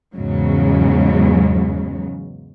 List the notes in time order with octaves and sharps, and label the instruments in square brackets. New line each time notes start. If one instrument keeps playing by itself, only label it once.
[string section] E2 G#2 C#3 F#3